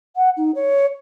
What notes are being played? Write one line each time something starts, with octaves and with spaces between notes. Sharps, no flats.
F#5
D#4
C#5